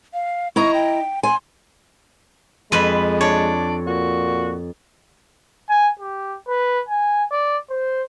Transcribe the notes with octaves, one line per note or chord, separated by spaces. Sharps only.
F5
E4 D#5 A#5 C#6
G5
G#5 C6
F2 G#3 B4 B5
D4 C#5
A#2 F#4
G#5
G4
B4
G#5
D5
C5